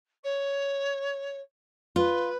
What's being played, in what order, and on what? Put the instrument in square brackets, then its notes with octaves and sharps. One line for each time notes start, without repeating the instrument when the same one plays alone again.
[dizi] C#5
[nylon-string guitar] F4 [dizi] B4